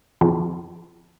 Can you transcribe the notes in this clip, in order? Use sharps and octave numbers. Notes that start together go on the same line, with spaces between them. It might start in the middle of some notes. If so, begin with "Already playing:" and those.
F2